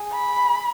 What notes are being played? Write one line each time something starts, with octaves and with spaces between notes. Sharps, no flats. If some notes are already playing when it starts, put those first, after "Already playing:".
Already playing: G#4
B5